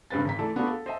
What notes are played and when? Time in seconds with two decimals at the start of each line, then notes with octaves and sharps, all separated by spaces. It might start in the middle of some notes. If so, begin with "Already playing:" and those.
0.10 F1 G2 B4 A6
0.25 G#1 A#5 B6
0.39 E3 A3 A4 D5
0.56 B3 D4 F4 F#4 A4
0.68 A4
0.86 C5 D#5 E5 A5